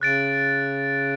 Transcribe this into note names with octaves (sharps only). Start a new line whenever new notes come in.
C#3 F#6 A6 D7